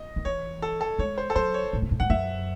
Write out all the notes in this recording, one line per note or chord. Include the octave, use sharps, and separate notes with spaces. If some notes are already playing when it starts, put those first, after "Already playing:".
Already playing: D#5
D#3
E3 C#5
A4
A4
G#3 C#5
C5
A4
F#3 C5
C#5
A2
C3
A2
G#2 F#5
F#2 E5